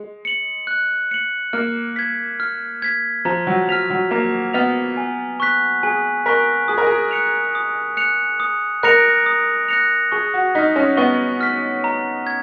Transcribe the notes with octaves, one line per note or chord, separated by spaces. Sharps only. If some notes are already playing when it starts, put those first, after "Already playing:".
Already playing: G#3
C#7 F#7
F#6
C#7 F#7
A#3 F6
G#6 B6
F6
G#6 B6
F3 A#5
F#3
F3 F6 B6 F7
F#3
A#3 A#5
B3 F6 B6 F7
G#5
C#6 F#6 B6
G#4 G#5
A#4 C#6 F#6 B6
G#4 D#6
A#4
G#4
F#6 C#7 F7
D#6
F#6 C#7 F7
D#6
A#4 F#6 A#6 C#7 F7
D#6
F#6 A#6 C#7 F7
G#4 C#6
F#4
D#4 F6 B6
C#4
B3 C#6
F6 B6
A#5
G#6